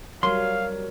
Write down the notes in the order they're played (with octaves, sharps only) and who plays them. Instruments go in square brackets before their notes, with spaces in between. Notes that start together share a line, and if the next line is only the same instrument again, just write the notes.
[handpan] F#3 G3 [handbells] A#4 C#5 [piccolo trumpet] F5 [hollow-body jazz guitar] C6